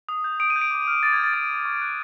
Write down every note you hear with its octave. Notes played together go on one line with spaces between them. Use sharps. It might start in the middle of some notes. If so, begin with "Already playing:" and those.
D#6
G6
D#6 D7
D#7
G6
D7
D6
F6
D6 A6
G#6
G6 A6
D#6 A6
G6
C#6
F#6